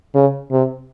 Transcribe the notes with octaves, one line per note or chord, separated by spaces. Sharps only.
C#3
C3